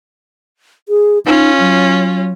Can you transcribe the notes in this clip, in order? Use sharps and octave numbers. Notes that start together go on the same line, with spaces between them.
G#4
C#4 D#4 F4
F#3